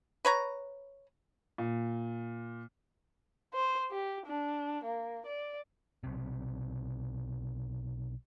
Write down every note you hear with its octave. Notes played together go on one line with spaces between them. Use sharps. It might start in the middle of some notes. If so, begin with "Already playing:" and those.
B4 C#5 A#5
A#2
C5
G4
D4
A#3
D5
B1 C3